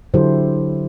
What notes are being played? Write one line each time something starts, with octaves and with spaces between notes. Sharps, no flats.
D3 F#3 E4 G4 A4 C5